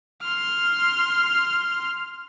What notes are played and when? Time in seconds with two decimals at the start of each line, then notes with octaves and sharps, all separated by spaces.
0.22 C6 F6